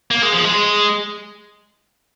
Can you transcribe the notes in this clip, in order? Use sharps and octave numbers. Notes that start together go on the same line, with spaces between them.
A#3
G#3
F3
G#3